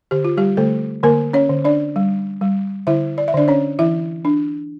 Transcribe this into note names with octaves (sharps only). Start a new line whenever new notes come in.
D3 G4
F4
G3 G4
D3 A3 A4
D3 A#3 A#4
C#4 C#5
D3
D4 D5
G3
G3
D3 E4 E5
D5
E5
D3 D4 D5
C#4 C#5
E3 E4 E5
D4